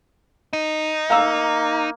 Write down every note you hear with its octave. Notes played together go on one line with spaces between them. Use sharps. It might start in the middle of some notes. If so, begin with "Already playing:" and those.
D#4
A#3 F5 A#5 E6